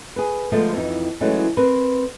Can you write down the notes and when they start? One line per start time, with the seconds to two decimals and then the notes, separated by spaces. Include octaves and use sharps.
0.16 G#4 B4
0.52 D3 F3 G#3 A3 B3
0.74 F2 E3 D#4
1.20 E3 F#3 G#3 A3 C#4 D#4
1.57 C4 A#4 B4